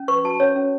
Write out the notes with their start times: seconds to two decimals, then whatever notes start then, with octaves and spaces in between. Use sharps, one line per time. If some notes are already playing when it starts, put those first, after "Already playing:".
Already playing: C#4
0.08 B4 C#6
0.24 F#4 A5
0.40 C#4 C#5
0.56 C#4